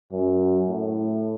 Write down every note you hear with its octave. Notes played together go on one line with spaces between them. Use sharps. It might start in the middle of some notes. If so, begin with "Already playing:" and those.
F#2
A2